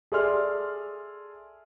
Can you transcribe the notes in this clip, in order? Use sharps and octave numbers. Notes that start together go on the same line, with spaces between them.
G#4 A4 D5 E5 C6 F6